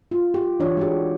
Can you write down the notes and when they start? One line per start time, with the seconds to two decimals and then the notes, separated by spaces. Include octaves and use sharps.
0.11 F4
0.34 G4
0.60 E3 D4 F4 C#5 D5
0.77 G#3 F#4 G4